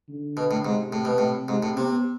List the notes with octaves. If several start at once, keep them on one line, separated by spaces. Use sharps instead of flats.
D3
B2
A2
G#2 C3
A2
B2
A2
G#2 C3
A2
C3 B3